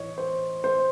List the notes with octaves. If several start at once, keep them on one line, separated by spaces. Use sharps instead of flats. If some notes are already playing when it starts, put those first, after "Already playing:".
Already playing: A2 E3 C#5 D#5
C5
C5